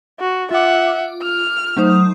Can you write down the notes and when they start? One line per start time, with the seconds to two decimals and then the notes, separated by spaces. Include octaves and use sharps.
0.20 F#4
0.51 F4 E5 F#5 D6
1.23 F6
1.77 F#3 A3 D#4 C5 D#6